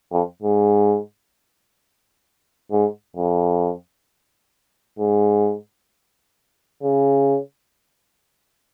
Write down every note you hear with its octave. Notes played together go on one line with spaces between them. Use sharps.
F2
G#2
G#2
F2
G#2
C#3